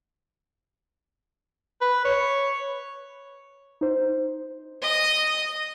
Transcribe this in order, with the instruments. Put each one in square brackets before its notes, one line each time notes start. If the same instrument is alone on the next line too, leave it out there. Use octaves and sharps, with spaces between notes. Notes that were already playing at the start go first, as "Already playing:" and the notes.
[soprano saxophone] B4
C#5
[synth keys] D#4 C5
[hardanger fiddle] D#5 D#6